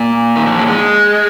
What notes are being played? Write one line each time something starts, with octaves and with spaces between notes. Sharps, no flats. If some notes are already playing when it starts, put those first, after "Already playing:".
Already playing: A#2
D#3
F3
F#3
G#3